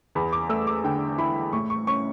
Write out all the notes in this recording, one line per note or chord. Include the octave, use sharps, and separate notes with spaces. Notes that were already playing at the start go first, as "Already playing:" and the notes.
E2 B5
D6
A3 E6
D6
D3 G5
E4 B5
A2 C#6
C#6
C#4 C#6